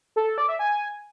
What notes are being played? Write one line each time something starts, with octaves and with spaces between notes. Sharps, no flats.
A4
A4
D5
E5
G#5